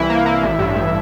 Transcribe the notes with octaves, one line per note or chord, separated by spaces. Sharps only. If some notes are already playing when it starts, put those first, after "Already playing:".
Already playing: C2 E3 E4
A#3
A#3
A1
G2
A1